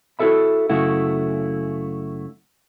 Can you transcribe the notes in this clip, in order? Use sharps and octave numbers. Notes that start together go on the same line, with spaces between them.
E4 F#4 G#4 A4 E5 B5
F#2 C#3 A3 E4 F#4